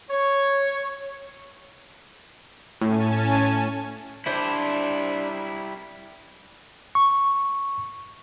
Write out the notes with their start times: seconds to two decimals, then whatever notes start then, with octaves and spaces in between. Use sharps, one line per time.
0.10 C#5
2.81 A2 C#4 G#5 A5
4.26 G3 D4 E4 C5
6.95 C#6